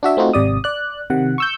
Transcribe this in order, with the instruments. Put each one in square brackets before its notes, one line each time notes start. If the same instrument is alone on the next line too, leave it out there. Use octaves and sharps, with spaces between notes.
[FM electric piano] D4 F#4 E5
A3 C4 D#4 F4 F#4
G#1 C3 D5 D#6
D5 F#6
C3 D#3 F#5
C#6 E6 G6